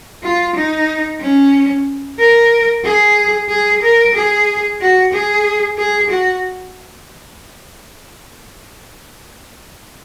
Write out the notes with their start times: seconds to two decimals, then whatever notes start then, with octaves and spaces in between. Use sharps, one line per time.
0.24 F4
0.56 D#4
1.21 C#4
2.19 A#4
2.84 G#4
3.49 G#4
3.83 A#4
4.15 G#4
4.81 F#4
5.13 G#4
5.78 G#4
6.11 F#4